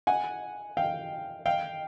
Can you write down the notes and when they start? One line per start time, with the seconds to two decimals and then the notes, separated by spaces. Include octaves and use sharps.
0.07 F#5 G#5
0.77 F5 G5
1.46 F5 G5